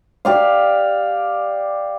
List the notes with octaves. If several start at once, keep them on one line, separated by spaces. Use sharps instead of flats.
G4 D5 F5